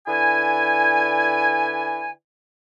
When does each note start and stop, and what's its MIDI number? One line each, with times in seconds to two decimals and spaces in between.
0.07 2.10 50
0.07 2.10 64
0.07 2.10 71
0.07 2.10 74
0.07 2.10 80